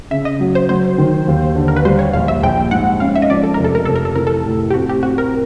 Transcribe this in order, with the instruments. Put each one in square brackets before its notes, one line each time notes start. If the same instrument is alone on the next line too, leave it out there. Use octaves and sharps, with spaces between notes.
[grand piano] C#3 [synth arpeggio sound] E5
[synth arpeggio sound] D#5
[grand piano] F#3
[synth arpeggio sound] C5
[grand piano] F#3 [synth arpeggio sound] C5
[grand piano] D#3
D#2
D3
[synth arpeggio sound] A#4
B4
[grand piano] G3 [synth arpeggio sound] C5
[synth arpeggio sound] C#5
[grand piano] A#1 [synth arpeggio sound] F5
[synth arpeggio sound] E5
[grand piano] A#1 [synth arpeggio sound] G5
[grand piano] G#2 [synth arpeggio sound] F#5
[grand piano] C#4 [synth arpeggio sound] F5
[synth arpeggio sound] E5
D#5
[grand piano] F3 [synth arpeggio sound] D5
[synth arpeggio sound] A4
[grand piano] F1 [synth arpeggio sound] A#4
[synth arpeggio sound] A4
A#4
[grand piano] F1 [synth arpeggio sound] A4
[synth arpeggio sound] A#4
A4
[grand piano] E3 [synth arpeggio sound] A#4
[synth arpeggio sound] A4
[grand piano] A2
[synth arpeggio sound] G4
[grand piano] C4 [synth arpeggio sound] F#4
[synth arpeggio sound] G4
[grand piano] C4 [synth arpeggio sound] F#4
[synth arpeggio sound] A#4